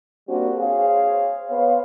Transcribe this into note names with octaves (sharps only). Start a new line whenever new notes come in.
G3 A#3 C4 D4 F#4
G#4 C5 C#5 F5
B3 C5 C#5 F5